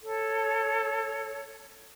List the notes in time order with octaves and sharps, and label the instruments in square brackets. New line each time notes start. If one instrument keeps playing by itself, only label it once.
[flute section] A4 C#5